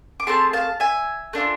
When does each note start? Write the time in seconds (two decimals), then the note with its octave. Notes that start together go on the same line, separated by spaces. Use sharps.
0.20 D6
0.27 A3 C4 G#4 A5 C6
0.53 F5 A5
0.80 E5 G#5
1.33 A3 D4 F4